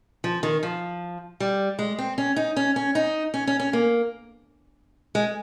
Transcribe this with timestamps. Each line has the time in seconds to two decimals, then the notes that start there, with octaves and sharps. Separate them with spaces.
0.24 F3
0.43 D#3
0.63 F3
1.40 G3
1.79 G#3
1.98 C4
2.18 C#4
2.36 D#4
2.56 C#4
2.76 C#4
2.95 D#4
3.34 C#4
3.47 C#4
3.60 C#4
3.73 A#3
5.15 G#3